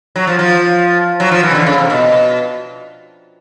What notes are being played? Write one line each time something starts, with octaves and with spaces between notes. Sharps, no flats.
F#3
F3
F3
F#3
F3
E3
C#3
D3
C#3
C3
B2